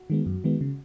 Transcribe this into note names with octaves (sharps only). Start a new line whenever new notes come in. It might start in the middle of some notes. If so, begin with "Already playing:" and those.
Already playing: F#4
D#3 G#3 B3
F#2
D#3 G#3 B3
C#3